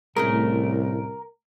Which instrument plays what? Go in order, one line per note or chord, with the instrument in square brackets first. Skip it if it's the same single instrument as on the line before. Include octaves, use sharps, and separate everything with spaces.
[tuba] C2 [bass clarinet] A2 [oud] A3 C#4 G#4 [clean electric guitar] A#4